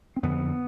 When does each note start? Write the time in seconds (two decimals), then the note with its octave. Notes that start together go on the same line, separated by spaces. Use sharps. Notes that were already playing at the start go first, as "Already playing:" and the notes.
0.16 C4
0.23 F2 D3 B3